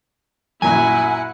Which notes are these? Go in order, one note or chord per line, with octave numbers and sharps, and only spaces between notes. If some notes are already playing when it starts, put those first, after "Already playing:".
F#2 A#2 F#3 E4 F#5 G#5